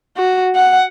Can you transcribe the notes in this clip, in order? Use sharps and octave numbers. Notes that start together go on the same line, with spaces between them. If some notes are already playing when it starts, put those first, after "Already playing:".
F#4
F#5